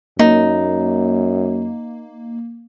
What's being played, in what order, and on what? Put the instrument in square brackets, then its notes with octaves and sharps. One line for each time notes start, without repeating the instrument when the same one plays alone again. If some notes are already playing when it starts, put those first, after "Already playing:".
[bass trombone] F#2 [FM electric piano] A#3 [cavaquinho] D#4